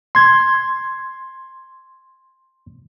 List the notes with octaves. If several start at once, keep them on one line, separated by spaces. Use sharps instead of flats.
C6 G#6